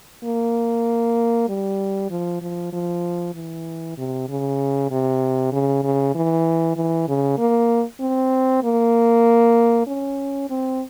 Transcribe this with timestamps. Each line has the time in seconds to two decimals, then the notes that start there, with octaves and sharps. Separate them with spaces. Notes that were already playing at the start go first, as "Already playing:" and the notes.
0.24 A#3
1.49 G3
2.10 F3
2.42 F3
2.73 F3
3.35 E3
3.98 C3
4.29 C#3
4.91 C3
5.52 C#3
5.83 C#3
6.15 E3
6.76 E3
7.08 C#3
7.38 A#3
8.00 C4
8.64 A#3
9.87 C#4
10.50 C4